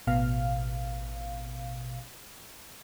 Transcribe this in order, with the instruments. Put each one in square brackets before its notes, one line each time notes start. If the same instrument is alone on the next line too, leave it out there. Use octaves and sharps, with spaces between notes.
[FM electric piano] A1 B2 F5